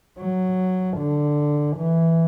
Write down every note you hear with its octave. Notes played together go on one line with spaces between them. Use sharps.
F#3
D3
E3